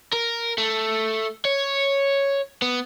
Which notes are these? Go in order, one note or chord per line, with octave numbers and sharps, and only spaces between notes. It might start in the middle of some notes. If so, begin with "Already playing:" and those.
A#4
A3
C#5
B3